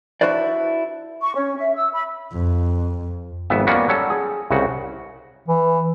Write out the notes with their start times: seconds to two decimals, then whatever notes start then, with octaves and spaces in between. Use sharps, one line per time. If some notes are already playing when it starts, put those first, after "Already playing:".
0.21 D4 E4 F#4 B4 C5 D5
1.22 C#6
1.35 C#4
1.57 E5
1.75 E6
1.93 B5
2.32 F2
3.50 G#1 F2 B3 E5
3.67 F3 G3 A#3 B3 C#4 F#4
3.88 F#3 G3 C#4 A4
4.10 G#4
4.51 C2 C#3 F#4
5.48 E3